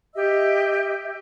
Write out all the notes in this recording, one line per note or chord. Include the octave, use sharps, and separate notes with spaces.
G4 D#5 E5 E6